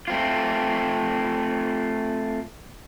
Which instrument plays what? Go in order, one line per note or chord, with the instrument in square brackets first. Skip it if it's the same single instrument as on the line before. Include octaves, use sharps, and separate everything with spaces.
[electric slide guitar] A3 C4 F4